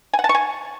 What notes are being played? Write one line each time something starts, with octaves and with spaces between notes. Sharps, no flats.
G#5
F#5
A5
C#6
G#5